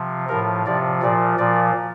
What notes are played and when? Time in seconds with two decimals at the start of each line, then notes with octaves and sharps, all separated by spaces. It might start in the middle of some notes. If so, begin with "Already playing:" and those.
Already playing: C3 F3
0.28 A2 F3 A#4
0.66 C3 F3 D5
1.02 A#2 F3 D5
1.38 A#2 F3 D5